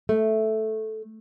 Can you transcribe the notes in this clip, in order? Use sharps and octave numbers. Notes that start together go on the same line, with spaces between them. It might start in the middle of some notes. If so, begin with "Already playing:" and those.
A3